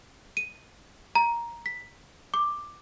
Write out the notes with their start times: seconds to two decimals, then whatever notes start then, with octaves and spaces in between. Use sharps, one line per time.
0.37 D#7
1.15 A#5
1.66 B6
2.34 D6